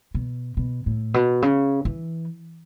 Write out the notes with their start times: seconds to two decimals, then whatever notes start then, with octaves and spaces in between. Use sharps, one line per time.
0.15 B2
0.57 B2
0.86 A2
1.14 B2
1.42 C#3
1.85 E3